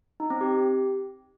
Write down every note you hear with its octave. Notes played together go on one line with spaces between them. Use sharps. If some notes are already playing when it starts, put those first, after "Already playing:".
D#4
C4
G4